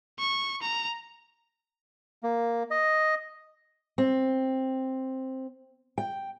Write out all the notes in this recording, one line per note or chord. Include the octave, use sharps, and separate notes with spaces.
C#6
A#5
A#3
D#5
C4
G5